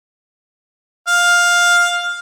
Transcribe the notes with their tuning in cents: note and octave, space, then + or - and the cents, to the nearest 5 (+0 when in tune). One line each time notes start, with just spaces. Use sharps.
F5 +10